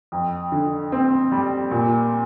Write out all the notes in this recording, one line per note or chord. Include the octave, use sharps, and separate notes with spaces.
F2
D3
C4
G3
A#2